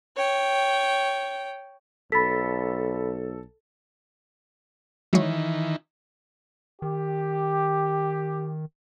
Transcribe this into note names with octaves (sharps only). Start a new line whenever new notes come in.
C#5 G5
B1 A4 B5 A6 B6
D#3 E3 F#3 G#3 C#5
D#3 G4